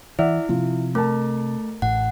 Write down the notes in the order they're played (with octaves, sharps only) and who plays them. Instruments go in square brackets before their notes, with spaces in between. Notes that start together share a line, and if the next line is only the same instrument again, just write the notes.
[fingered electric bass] E3 [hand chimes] E4 [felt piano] D5 E5 F#5
[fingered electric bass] C3 [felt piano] F3
[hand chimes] A3 [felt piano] A#4 A5
[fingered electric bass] A1 A2 [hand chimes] F#5